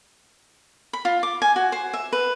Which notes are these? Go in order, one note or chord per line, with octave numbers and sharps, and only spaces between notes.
B5
F4
D6
G#5
F#4
C5
E5
B4